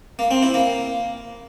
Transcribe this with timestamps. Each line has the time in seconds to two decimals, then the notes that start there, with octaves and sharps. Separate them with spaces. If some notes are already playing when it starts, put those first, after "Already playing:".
0.19 A#3
0.31 C4
0.42 E4
0.54 A#3